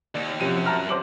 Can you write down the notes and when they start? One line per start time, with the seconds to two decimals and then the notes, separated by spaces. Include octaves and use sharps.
0.15 D#2 D5
0.40 F#2 C3 F3 D#7
0.66 A5 A#5 F6
0.89 C5 D6 F#7